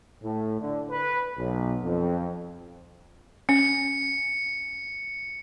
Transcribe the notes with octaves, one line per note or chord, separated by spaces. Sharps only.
A2
D3
B4
B1
F2
C#4 C#7